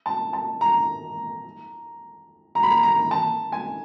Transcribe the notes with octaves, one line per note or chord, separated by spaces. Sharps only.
A5
A5
A#5
A#5
B5
A#5
A#5
A5
G#5